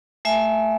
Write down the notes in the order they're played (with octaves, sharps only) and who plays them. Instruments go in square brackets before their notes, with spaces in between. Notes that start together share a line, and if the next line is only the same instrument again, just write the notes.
[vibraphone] A3 E5 G#5